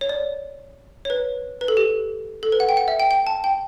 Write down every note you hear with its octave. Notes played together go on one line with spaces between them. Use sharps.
C#5
D5
C#5
B4
B4
A4
G4
A4
B4
F#5
G5
F#5
E5
G5
G5
A5
G5